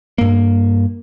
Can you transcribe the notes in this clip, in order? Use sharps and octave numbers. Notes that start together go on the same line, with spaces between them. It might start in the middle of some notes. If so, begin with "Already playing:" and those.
G2 A#3